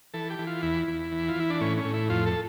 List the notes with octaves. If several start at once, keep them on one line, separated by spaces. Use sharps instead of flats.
E3 A4
G4
E3
F4
E2 E4
E2
E3
F4
E3 E4
D4
A2 C#4
C#4
A2
E4
F2 F4
A4